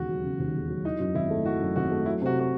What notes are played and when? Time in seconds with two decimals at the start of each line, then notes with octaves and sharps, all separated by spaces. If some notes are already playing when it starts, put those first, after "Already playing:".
Already playing: E1 D#2 C#3 F#4
0.09 F#3
0.24 C#3
0.39 D#2
0.55 E1
0.69 F#3
0.85 E3 D#4
1.00 F#2
1.15 G#1 E4
1.30 A3
1.45 E3 F#4
1.60 F#2
1.76 G#1 F#4
1.91 A3
2.06 F#3 E4
2.22 C3 F#4
2.39 F#4